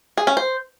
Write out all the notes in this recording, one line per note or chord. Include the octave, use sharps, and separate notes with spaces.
G#4
C#4
C5